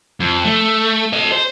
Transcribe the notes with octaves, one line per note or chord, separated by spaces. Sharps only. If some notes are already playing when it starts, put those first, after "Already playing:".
F2
A3
A4 D#5
C5